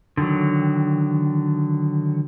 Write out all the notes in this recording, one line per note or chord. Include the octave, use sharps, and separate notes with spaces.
D3 D#3 F#3